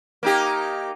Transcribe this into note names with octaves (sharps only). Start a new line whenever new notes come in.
A#3 D#4 G4